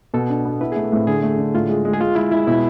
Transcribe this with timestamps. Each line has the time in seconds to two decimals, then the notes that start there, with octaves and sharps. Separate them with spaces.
0.14 B2 A4
0.30 D4
0.45 B3
0.61 E4 B4
0.72 G#4
0.76 A3
0.83 B3
0.92 A2 C4
1.07 D3 G#4
1.23 A3
1.38 D3
1.54 A2 F4
1.69 G#3
1.85 G#3
1.94 G#4
2.01 G#3 F4
2.16 G#3 E4
2.32 G#3 E4
2.47 B2 E4